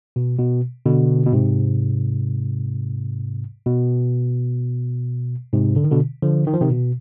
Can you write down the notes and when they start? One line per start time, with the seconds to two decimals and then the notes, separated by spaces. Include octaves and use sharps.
0.16 B2
0.39 B2
0.85 B2 D3
1.26 B2
1.33 G#2 C3
3.66 B2
5.53 G#2 C3
5.76 D3
5.84 D#3
5.91 B2 D3
6.22 D3 F3
6.47 D#3
6.54 F3
6.61 C3 D#3
6.70 B2